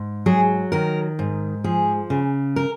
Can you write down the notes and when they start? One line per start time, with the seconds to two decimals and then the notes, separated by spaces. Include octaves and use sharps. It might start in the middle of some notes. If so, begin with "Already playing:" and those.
Already playing: G#2
0.26 F#3 G#4
0.72 D#3 A#4
1.19 G#2
1.64 F3 G#4
2.10 C#3
2.56 A#4